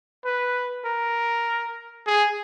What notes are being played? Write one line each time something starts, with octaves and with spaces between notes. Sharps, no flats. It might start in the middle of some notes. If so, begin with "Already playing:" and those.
B4
A#4
G#4